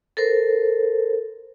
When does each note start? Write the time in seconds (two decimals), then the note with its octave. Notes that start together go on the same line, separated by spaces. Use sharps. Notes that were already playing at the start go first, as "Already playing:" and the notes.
0.17 A4 A#4 C5